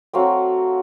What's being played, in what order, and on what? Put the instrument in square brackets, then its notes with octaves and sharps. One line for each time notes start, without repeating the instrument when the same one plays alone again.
[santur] F#3 A3 C4 F5 G5